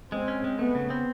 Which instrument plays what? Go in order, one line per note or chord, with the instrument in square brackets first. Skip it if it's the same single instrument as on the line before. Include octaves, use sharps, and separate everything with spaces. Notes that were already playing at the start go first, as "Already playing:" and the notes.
[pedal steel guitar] G#3 [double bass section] C4
[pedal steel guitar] C#4
G#3
[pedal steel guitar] A3 [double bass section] B3
[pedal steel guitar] C#3
C4